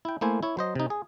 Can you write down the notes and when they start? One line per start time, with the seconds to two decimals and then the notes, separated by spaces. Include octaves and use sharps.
0.05 E4 G5
0.21 A3 A#3 E4 C5 G#5
0.43 E4 C#5
0.57 F#3 C5 D#5
0.75 C3 D#4
0.90 G#4